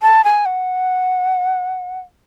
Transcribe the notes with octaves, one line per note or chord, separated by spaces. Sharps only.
A5
G#5
F#5